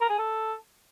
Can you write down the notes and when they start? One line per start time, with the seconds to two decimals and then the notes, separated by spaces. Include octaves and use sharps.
0.01 A#4
0.10 G#4
0.18 A4